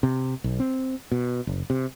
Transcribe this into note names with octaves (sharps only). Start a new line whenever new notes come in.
C3
B1
C4
B2
F#1
C3